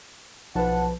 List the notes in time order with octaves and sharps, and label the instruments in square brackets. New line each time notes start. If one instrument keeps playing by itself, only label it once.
[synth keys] B1 A5 [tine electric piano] F3 B4 [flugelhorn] F#5